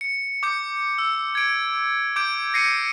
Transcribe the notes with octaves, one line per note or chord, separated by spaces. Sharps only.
C#7
D6 G6 C#7
E6
G#6 D7
D6 G6 D7
A#6 C7 C#7 D#7